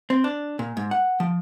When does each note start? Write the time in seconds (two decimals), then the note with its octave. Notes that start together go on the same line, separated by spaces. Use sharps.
0.10 C4
0.24 D4
0.59 A#2
0.77 G#2
0.91 F#5
1.20 F3